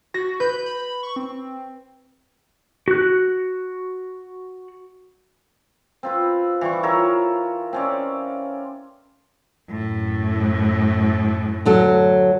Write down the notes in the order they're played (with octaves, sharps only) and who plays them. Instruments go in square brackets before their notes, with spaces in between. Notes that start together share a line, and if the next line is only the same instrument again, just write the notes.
[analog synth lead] F#4 [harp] A#6
[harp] B4 [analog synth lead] G6
[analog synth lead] B5
C#6
C4
[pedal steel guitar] F#4 F#6
[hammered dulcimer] C4 F4 B4
E3 G3 C#6
F4 A#4 C#5 E5
C4 C#4 D5
[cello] F#2 A2
[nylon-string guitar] D2 F#3 A4